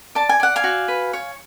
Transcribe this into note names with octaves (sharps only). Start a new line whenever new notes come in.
D5 A5
G#5
D5 F#5
F5 G#5
F#4
B4
C#5